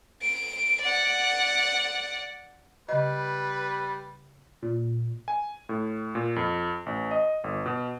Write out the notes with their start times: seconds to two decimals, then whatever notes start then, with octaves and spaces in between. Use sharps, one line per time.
0.22 D7
0.81 D5 F#5
2.89 C#3 G3 B4 D#5
4.62 A#2
5.28 G#5
5.69 A2
6.15 A#2
6.36 F2
6.86 A1
7.11 D#5
7.44 G1
7.66 B2